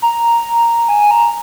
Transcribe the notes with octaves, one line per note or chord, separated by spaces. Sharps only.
A#5
G#5
A#5